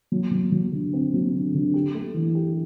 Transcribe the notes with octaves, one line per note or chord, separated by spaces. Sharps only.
F#3
F#3
F#3
D3
C4
F#3
D3
D3
G4
A3
E3
G4